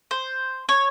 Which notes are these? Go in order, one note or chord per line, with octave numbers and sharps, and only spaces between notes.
C5
C#5